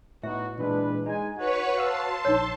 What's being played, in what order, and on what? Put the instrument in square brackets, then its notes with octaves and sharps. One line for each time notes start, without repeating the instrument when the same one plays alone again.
[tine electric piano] A2 [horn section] B3 D#4 F#4 [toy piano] E5
[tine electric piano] A#2 E3 G#3 [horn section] D4 B4
[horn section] G#3 G#5 [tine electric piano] D#4
[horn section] F#4 [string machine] B4 C#5 C#6
[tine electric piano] F5 E6 [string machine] A5 C6
[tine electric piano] A#1 E6 [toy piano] D#4 C#5